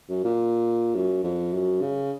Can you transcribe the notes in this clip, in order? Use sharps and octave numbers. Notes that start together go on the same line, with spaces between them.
F#2
A#2
F#2
F2
F#2
C#3